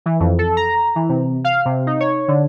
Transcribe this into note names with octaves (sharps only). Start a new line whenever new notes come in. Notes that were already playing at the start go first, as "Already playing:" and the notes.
E3
F2
A4
A#5
E3
C3
F5
C3
D#4
C#5
D3